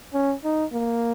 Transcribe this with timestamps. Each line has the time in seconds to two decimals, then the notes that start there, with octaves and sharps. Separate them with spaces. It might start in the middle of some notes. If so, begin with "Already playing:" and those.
0.14 C#4
0.44 D#4
0.73 A#3